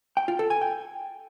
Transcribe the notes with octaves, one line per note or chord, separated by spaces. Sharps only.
G5
F4
A4
G#5
G5